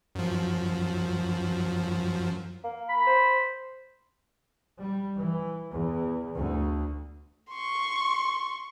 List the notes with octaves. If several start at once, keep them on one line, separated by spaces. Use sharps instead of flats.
F#2 F3
A#3
B5
C5
G3
E3
E2
D2
C6 C#6